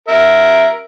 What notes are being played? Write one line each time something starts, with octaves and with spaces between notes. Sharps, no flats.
A#4 E5